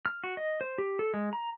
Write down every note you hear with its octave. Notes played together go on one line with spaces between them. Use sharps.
F6
F#4
D#5
C5
G4
A4
G#3
A#5